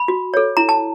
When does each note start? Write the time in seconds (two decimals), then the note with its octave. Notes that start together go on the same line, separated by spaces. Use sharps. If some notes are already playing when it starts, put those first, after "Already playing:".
Already playing: B5
0.08 F#4
0.34 A4 C#5
0.57 E4 A#5
0.69 A5